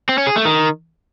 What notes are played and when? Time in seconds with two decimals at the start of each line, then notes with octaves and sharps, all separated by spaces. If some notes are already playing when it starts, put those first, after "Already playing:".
0.09 C4
0.18 C#4
0.27 G#4
0.36 A3
0.45 D#3